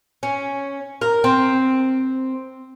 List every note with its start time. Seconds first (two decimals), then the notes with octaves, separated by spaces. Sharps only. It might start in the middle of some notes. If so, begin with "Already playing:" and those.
0.23 C#4
1.01 A#4
1.24 C4